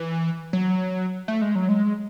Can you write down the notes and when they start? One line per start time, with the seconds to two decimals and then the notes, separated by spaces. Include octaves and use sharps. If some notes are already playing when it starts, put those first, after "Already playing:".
Already playing: E3
0.53 F#3
1.28 A3
1.42 G#3
1.55 F#3
1.69 G#3